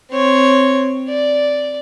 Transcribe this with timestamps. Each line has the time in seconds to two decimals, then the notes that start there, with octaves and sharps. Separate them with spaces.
0.11 C4 C#5
1.08 D5